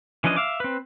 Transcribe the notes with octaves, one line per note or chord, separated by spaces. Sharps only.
E3 F3 C#4 D4 D#5
E5 F5 D6
C4 B4